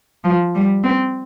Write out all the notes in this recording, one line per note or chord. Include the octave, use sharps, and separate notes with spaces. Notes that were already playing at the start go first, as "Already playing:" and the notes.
F3
G3
C4